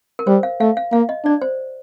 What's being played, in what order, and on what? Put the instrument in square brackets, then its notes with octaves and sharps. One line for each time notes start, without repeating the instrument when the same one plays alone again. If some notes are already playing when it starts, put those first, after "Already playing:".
[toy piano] A#4
[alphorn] G3 [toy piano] C5
[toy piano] F5
[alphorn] A3 [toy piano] F5
[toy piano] F5
[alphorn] A#3 [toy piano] F5
[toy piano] D#5
[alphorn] D4 [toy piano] D5
[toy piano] C5